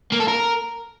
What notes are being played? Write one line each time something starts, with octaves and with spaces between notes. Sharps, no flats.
A#3
A4
A#4